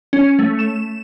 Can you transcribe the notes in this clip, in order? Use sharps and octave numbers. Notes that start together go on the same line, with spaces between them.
C#4
A3
E7